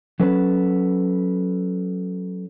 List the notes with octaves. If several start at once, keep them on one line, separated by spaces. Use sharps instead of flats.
F#3 C#4 A4 B4